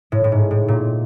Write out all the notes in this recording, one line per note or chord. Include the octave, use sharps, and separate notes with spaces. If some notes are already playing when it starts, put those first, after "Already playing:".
A2
A2
G#2
A2
A#2